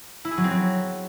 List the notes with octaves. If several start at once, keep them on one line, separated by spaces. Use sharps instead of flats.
E4
G#4
F#3
C4
F#3